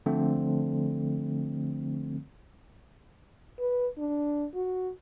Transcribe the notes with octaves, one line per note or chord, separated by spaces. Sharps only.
D3 F3 A3 C4
B4
D4
F#4